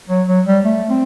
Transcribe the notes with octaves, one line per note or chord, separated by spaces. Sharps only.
F#3
F#3
G3
A3
C4